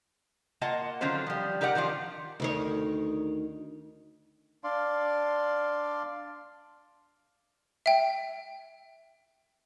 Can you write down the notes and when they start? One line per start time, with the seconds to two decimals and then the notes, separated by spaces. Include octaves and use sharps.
0.61 A#3 F4 D#5 F#5 A5
1.01 D3 D#3 F#3 C#4 F4 C5
1.27 F3 G3
1.61 D#4 G4 A#4 D5 F#5
1.75 D#3 F3 D4 F4
2.40 D2 D#3 C#5
4.64 D4 D5 F5 C6
7.86 E5 G5